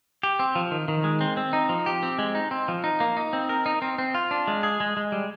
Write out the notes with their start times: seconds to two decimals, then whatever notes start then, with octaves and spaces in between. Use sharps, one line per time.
0.23 G4
0.39 C4
0.55 F3
0.71 D#3
0.88 D#3
1.04 G#3
1.21 C4
1.37 C4
1.53 D#4
1.69 F3
1.86 G4
2.03 C4
2.19 G#3
2.35 D#4
2.51 C4
2.68 F3
2.84 D#4
3.00 A#3
3.17 D#4
3.33 C4
3.49 A#4
3.66 D#4
3.82 C4
3.98 C4
4.15 F4
4.31 D4
4.48 G#3
4.63 G#4
4.80 G#3
4.97 G#3
5.12 G3